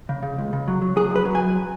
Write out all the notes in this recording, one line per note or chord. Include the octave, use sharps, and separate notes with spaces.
C#3
C#3
C#2
C#3
F#3
F#3
F#3 G#4
F#2 B4
F#3
F#2 G#5